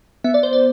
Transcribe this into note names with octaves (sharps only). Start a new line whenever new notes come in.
B3 E5
D5
C5
D5